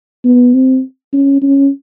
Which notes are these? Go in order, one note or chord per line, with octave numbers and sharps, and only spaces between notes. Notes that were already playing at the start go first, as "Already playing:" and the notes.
B3
C4
C#4
C#4